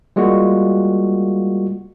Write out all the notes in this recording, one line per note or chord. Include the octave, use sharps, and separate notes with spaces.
G3 G#3 A#3 F4 F#4